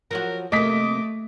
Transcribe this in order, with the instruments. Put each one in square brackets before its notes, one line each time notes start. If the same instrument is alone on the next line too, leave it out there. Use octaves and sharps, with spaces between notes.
[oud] F3 F#3 F#4 [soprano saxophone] A#4
[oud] C3 A#3 [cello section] A3 [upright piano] D#5 B6 [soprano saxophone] D6